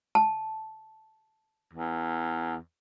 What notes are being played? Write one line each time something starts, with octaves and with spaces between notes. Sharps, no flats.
A5
E2